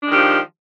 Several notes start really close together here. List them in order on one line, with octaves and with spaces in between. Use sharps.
D4 G#3 D#3 G4 F3